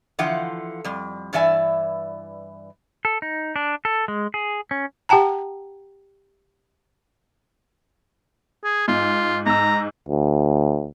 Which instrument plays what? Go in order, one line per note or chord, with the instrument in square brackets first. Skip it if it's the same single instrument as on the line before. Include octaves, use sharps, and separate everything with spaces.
[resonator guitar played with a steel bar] D3 E3 F3 F4 F#5 G5
F2 G3
G2 E3 D5 E5 G#5
[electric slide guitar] A4
D#4
D4
A4
G#3
G#4
C#4
[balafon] G4 F#5 G5 A5 A#5
[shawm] G#4
[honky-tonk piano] G#2 [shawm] F4
[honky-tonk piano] G#2 E6 [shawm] A#5
[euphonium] D2